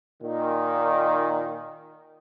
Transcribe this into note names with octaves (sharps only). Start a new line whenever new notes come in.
A#2 D#3